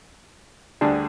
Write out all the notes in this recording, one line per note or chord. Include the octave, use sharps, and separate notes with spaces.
D2 D3 G3 D4 G#4